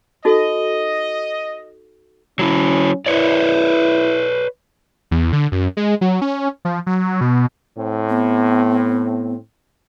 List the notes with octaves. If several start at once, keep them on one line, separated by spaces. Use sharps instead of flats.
D#4 F#4 A4 D#5
F#3 C#4 E4
E4 B4 C#5 D5
E2
D3
F#2
G#3
F#3
C#4
F3
F#3
B2
A2 C4
B3